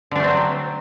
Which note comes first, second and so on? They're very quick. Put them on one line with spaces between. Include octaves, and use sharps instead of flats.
D3 D4 A3 C4 F#3